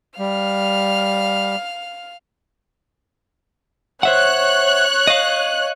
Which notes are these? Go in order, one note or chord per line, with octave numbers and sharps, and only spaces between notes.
G3 F5 F6
C5 C#5 E5 F#5 F#6
D#5 F5